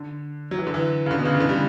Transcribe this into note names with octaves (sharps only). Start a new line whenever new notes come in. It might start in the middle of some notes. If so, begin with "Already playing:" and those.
Already playing: D3
F#3
E3
D3
E3
C#3
D3
B2
C#3
E3
D3
G3